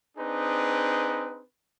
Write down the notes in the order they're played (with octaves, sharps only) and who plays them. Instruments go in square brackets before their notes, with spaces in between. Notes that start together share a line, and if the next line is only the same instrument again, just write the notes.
[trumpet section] C4 D4 D#4 G#4 B4